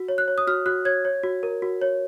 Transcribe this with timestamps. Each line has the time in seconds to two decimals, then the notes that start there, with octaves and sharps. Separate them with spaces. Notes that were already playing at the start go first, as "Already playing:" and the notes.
Already playing: F#4
0.09 C#5
0.18 F#6
0.28 C#5
0.38 D#6
0.47 F#4 F6
0.66 F#4 F#6
0.85 C#5 G#6
1.05 C#5
1.23 F#4
1.43 A#4
1.62 F#4
1.82 C#5